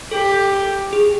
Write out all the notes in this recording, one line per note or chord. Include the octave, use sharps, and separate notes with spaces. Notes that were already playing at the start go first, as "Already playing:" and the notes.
G4 A4
G#4